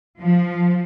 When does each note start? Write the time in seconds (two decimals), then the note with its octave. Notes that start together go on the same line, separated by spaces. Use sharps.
0.21 F3